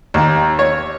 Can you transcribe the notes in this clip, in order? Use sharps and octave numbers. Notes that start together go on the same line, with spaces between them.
D#2
C#5